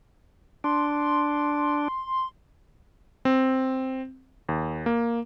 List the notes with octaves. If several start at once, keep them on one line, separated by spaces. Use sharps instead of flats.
D4 C6
C4
D#2
A#3